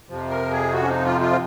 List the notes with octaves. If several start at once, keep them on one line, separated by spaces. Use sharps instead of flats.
F2 C3 F3
A#4
G#4
F#4
C#4
D#4
F4
F4
C4